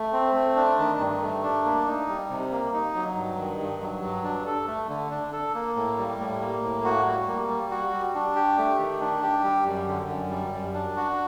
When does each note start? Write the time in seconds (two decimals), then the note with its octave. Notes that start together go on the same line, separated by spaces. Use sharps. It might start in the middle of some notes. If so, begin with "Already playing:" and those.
Already playing: A3
0.13 C4
0.34 A3
0.56 D4
0.79 D#3
0.99 G2
1.22 A3
1.43 D4
1.65 A#3
1.86 D#4
2.08 G3
2.29 C3
2.51 A#3
2.73 D#4
2.95 F#3
3.16 G2
3.38 D#3
3.60 G2
3.81 F#3
4.03 G2
4.24 D4
4.46 A4
4.67 A3
4.89 D3
5.11 D4
5.33 A4
5.55 A#3
5.76 A2
5.98 G3
6.20 A2
6.41 A#3
6.62 A2
6.85 F#4
7.06 G3
7.27 A#3
7.49 G3
7.71 F#4
7.93 G3
8.15 D4
8.36 G4
8.57 A3
8.79 D#3
9.01 D4
9.23 G4
9.44 G3
9.66 F#2
9.88 D3
10.09 F#2
10.31 G3
10.53 F#2
10.74 D4
10.96 F#4